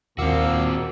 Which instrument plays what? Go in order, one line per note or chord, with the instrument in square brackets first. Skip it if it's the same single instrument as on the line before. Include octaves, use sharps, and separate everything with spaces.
[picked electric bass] D#2 [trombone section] A#2 [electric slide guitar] C4 F#4 [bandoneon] F5 D6 E6